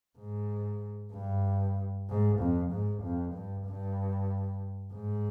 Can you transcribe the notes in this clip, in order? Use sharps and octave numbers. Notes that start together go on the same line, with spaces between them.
G#2
G2
G#2
F2
G#2
F2
G2
G2
G#2